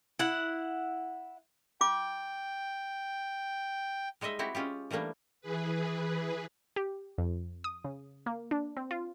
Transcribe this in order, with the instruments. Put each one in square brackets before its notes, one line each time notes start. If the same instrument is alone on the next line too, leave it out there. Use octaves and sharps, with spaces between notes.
[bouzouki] E4 F#5
[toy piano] F4 D6 [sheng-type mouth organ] G5
[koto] G3 G#3 D#4 D#5 E5
C4 E4 F#4 G4
G#3 C#4 F4 G4
E3 G3 A3 A#3 D4
[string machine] E3 G#4 B4
[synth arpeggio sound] G4
F2
D#6
C#3
A#3
D4
C4
F4